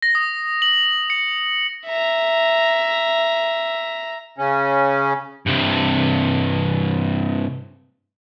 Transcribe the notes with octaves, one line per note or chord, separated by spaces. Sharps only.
A#6
D#6
F#7
C#7
E5 A#5
C#3 C#4
G2 C3